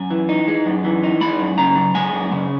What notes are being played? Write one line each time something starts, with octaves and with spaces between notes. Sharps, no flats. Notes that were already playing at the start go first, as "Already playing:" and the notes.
Already playing: F#2 G#5
E3
D#4
G#3
F#2
E3
D#4
G#3 B5
F#2
C#3 A#5
F#2
G#3 G#5
F#2
C#3